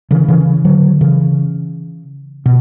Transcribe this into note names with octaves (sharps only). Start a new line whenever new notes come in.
C#3 E3
C#3 E3
D3 F#3
C#3 E3
B2